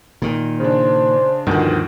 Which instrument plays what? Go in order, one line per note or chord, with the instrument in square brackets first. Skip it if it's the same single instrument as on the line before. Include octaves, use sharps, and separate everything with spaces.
[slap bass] A#2 D#3
[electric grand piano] C#3 D4 [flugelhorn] C5
[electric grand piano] D2 B2 D#3 [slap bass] G2 F3